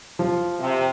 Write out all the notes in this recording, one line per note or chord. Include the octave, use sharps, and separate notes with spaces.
F3
C3